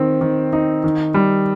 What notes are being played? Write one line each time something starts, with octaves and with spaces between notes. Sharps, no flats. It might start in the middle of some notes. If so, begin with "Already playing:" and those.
Already playing: D#3 C4
D#3
D#4
D#3
G3